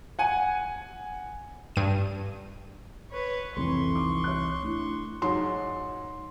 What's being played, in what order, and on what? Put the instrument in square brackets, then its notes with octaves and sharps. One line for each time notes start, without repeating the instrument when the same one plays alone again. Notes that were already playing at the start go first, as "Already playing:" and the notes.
[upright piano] F#5 G#5
[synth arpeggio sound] G2 D#7
[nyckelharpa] B4 C#5
[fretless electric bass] C2 C3 E3 [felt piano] F2 A4 [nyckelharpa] C6 C#6
[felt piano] D#4 D6
C#5 F#6
A3 D4 E4
[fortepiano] G#2 F#3 [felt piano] C6